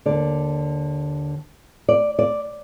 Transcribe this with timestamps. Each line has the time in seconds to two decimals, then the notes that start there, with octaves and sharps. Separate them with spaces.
0.06 D#2 D3 D5
1.89 D5
2.19 D5